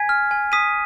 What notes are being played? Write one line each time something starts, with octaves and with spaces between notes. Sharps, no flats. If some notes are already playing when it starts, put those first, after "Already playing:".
Already playing: G#5 G#6 B6
F6
G#5
D#6 B6 D#7